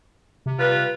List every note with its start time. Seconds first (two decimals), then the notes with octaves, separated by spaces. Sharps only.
0.46 C3
0.59 G3 F4 B4